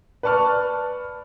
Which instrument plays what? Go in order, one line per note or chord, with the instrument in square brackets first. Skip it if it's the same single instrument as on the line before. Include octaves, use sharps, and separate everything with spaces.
[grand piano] B4 D5 A5 C#6 F6